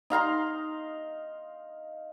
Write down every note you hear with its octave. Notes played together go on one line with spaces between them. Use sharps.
D#4 F5 A#5 C6